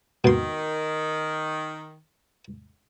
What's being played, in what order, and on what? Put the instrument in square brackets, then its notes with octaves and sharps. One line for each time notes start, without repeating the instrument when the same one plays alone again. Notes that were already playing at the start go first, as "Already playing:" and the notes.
[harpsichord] B2 C6 [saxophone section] D#3